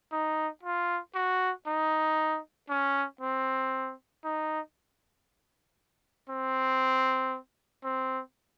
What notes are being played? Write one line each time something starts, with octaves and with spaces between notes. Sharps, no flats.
D#4
F4
F#4
D#4
C#4
C4
D#4
C4
C4